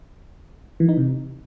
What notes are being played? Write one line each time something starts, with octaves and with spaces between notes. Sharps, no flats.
E3
D#4
C3